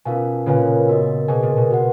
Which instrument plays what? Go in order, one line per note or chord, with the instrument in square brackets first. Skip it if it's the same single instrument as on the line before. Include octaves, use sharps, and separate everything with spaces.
[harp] B2 [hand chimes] C#4 F4 A#4 F5 G#5
[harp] A#2 C#3 [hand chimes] C#4 F4 B4 F5 G#5
[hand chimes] B3 F#4 A#4 D#5
[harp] B2 [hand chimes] G#4 D#5 G#5
[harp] A#2
B2
[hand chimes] F#4 B4 F#5